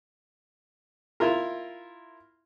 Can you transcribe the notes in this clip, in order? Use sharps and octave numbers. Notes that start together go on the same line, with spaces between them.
E4 F4 A#4